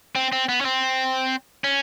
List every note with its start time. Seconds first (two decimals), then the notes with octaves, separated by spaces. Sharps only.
0.15 C4
0.32 C4
0.49 B3
0.61 C#4
0.65 C4
1.64 C#4